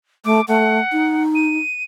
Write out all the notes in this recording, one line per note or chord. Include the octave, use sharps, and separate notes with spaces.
A3 D6
A3 F#5
D#4
D#7